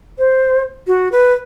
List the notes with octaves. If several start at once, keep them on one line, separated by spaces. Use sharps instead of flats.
C5
F#4
B4